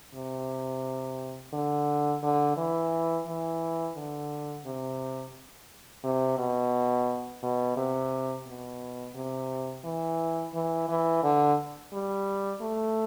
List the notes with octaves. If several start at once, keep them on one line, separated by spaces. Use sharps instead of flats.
C3
D3
D3
E3
E3
D3
C3
C3
B2
B2
C3
B2
C3
E3
E3
E3
D3
G3
A3